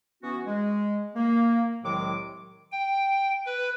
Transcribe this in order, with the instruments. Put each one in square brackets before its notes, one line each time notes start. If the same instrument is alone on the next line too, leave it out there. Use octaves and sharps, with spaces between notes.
[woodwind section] E3 B3 C#4 F#4
G#3
A#3
C2 A2 D#3 F#3 G#3 D6
[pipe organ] G5
B4